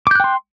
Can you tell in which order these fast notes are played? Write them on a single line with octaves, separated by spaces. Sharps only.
D6 G6 F#6 G5 C6